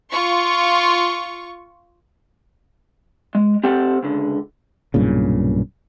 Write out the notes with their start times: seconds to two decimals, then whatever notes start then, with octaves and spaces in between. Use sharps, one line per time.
0.12 F4 C#6
3.35 G#3
3.64 C4 G4 A4 C5 F#5
4.03 C#2 D3
4.94 B1 G2 A#2 C#3